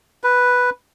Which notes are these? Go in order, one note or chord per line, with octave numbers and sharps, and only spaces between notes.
B4